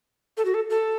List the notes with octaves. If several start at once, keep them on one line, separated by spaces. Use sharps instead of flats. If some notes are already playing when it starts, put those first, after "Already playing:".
A4
F#4
A4
A4